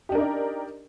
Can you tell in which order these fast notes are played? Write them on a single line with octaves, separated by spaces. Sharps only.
G4 D4 A#4 D#4 D5